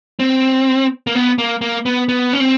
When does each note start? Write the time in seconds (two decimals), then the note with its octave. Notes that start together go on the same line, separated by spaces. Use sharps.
0.19 C4
1.07 A#3
1.15 B3
1.38 A#3
1.61 A#3
1.86 B3
2.09 B3
2.33 C#4
2.40 C4